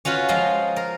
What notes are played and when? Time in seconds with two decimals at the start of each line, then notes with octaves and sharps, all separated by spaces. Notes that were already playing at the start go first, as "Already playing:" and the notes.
0.05 C#4 F4 F#4 B4
0.28 F3 G#3 F5 A#5 C6
0.76 A#4